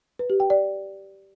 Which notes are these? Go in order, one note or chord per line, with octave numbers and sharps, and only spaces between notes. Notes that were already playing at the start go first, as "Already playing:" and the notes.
B4
G4
G5
D5